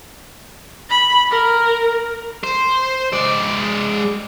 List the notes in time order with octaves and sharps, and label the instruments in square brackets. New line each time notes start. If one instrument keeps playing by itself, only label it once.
[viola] B5
A#4
[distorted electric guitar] C5
G#3 D5